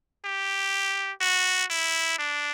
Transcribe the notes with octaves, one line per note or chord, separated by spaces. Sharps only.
G4
F#4
E4
D4